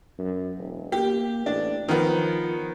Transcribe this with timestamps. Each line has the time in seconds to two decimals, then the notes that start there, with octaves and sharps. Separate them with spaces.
0.19 F#2
0.57 E1
0.92 A#3 G4
1.46 A1 D4
1.88 D#3 F3 B3